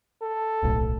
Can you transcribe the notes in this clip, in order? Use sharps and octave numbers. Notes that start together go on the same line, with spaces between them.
A4
D1 B1 A2